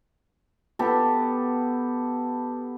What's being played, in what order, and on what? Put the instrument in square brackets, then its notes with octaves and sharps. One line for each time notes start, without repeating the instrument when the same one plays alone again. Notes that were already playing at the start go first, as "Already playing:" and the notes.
[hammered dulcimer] B3 G4 A4